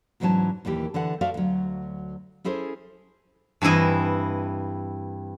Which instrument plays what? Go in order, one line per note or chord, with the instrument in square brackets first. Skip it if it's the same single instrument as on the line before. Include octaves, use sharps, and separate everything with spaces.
[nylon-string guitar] D2 G#2 E3 F#3 C#4 A5
D#2 A#2 E3 G4
D3 E3 A4 F#5
F#4 A4 C5 D5 E5 F5
D2 F#3
C#4 E4 G#4 A4 C5
[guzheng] G2 E3 C4 E4 D#5